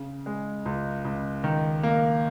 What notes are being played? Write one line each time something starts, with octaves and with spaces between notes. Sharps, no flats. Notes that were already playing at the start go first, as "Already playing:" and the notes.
Already playing: C#3
G#3
C#2
C#2
D#3
A#3